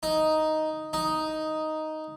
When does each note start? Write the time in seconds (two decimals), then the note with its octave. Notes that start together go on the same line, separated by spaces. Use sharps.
0.03 D#4
0.93 D#4